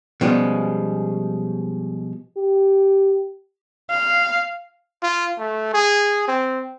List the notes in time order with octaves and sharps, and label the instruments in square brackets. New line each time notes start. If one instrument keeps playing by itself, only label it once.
[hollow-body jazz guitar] B2 F3 G3 G#3 C#4
[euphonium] G4
[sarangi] F5
[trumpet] F4
A3
G#4
C4